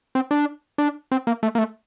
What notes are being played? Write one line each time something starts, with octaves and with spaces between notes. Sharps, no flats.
C4
D4
D4
C4
A#3
A3
A#3
A3